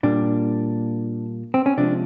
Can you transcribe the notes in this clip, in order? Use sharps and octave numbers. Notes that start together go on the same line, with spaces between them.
A#2 G3 A#3 D4
C4
C#4
C3 F3 G#3 D4